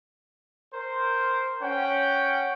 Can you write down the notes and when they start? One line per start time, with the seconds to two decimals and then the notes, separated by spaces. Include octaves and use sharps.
0.74 A#4 C5
1.62 C#4 F#5 G5